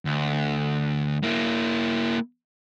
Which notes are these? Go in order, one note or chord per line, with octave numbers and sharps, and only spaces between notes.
D2
A#3 E4